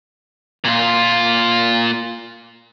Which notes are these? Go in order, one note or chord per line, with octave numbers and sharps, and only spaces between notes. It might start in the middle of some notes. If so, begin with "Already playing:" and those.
A#2 F4